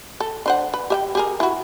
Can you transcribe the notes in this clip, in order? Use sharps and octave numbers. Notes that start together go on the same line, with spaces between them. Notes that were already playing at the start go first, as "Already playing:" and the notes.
A4
D4 C5 F#5
B4
G4 E5 G5
G4 G#4 A#4
E4 F#4